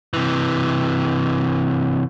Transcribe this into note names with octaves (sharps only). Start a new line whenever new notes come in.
C3 E3